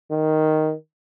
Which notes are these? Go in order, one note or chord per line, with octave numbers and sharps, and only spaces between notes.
D#3